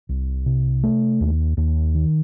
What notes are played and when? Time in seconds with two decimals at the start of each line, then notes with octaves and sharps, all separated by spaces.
0.09 C2
0.46 C3
0.84 A3
1.21 D#2
1.57 D#2
1.94 D#3